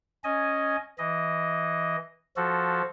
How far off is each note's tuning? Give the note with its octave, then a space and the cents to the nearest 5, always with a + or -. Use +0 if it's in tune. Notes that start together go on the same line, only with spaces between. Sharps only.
C#4 +0 D#5 +0 G#5 +0
E3 +0 D#5 +0
F3 +0 F#4 +0 A4 +0